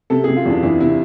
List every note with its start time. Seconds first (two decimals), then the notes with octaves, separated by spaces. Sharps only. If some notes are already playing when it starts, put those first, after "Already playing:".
0.10 C3 A4
0.24 C3 G#4
0.37 F4
0.45 E2 D4
0.63 E2 E4
0.80 C3 E4